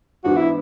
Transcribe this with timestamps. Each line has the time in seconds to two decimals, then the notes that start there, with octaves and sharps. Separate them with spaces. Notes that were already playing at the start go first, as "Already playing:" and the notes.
0.24 G#2 E3 B3 D4 F#4
0.37 E4